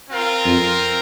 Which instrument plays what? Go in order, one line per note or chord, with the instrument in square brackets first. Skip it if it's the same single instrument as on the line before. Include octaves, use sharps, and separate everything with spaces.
[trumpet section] C4 F4 A#4
[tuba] F2